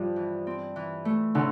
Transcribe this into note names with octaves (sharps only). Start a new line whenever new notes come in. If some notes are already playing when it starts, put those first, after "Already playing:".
Already playing: G2 F3 G3
E3
C4
E3
A3
A2 D3